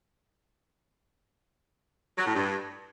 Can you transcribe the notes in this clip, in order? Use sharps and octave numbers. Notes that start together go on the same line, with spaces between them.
F#3
A2
G2